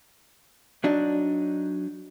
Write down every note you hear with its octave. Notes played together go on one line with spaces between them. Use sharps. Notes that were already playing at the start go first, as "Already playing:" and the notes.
F#3 D4 D#4